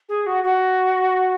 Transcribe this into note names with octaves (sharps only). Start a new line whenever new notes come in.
G#4
F#4
F#4